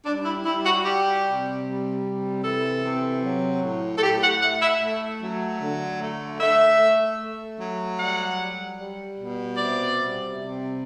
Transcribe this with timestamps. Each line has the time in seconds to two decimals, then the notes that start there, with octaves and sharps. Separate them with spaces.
0.06 G3 D4
0.25 E4
0.45 G3 E4
0.65 F#4
0.85 G3 G4
1.25 C3
1.64 G3
2.04 C3
2.44 E3 A4
2.83 C3
3.23 F#3
3.63 A2
3.97 A4
4.02 A2 G4
4.22 F#5
4.42 A3 F#5
4.61 E5
4.82 A3
5.21 F#3
5.61 D3
6.00 A3
6.40 A3 E5
6.80 A3
7.20 A3
7.59 F#3
7.99 G3 F#5
8.38 G3
8.78 G3
9.17 B2
9.57 C3 D5
9.97 G3
10.37 C3